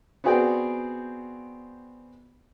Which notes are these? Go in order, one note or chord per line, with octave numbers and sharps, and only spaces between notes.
B3 C4 F#4 G#4 D5 G5